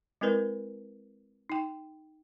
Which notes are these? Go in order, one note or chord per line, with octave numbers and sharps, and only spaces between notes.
G#3 C4 E4 A#4 B4 D5
D#4 G5